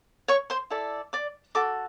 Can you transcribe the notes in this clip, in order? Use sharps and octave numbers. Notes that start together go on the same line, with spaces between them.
C#5 C#6
C5 C6
E4 A4 D5
D5 D6
F#4 A4 D6